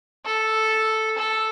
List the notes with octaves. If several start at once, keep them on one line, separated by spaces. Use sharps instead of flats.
A4
A4